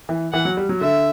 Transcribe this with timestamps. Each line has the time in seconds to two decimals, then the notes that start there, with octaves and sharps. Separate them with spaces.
0.09 E3
0.33 E3 F#5
0.45 F#3
0.57 G3
0.69 F#3
0.81 D3 E5